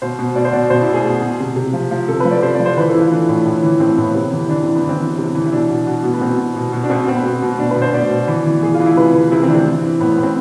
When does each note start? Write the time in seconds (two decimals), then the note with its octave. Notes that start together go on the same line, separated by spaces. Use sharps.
0.02 B2 C5
0.19 B2
0.36 B2 D5
0.45 C5
0.52 B2 D5
0.70 B2 C5
0.82 E4
0.88 B2
0.94 G#4
1.05 B2
1.22 B2
1.40 C3
1.56 C3
1.73 F3
1.91 F3
2.08 C3 A4
2.20 F3 B4
2.31 D5
2.43 C3 C5
2.55 D5
2.60 F3
2.65 C5
2.77 E3 B4
2.89 A4
2.94 E3 E4
3.00 F4
3.11 E3 D4
3.29 A2
3.45 A2
3.63 E3
3.80 A2 C4
3.97 A2 B3
4.15 C3
4.32 E3
4.49 E3 D4
4.63 E3 C4
4.76 B3
4.84 E3
4.89 C4
5.02 E3
5.18 C3
5.35 E3
5.46 E4
5.53 B2 D4
5.70 B2
5.87 B2
6.04 B2
6.14 B3
6.21 B2 C4
6.38 B2
6.56 B2
6.73 B2
6.84 D4
6.90 B2 C4
7.08 B2 C4
7.16 B3
7.23 B2 C4
7.42 B2
7.59 B2 D4
7.71 B4
7.76 B2
7.82 C5
7.93 B2 D5
8.11 B2
8.27 E3
8.46 E3
8.62 E3 G#4
8.74 F4
8.80 E3
8.86 E4
8.97 C3 B4
9.14 E3
9.31 C3 E4
9.43 C4
9.48 E3 D4
9.55 C4
9.66 E3
9.83 E3
10.00 A2 B3
10.12 B3
10.18 A2
10.23 C4